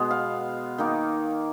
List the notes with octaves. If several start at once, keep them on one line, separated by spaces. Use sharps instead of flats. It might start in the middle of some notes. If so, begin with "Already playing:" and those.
Already playing: B2 G#3 B3
F5
D#3 A#3 D#4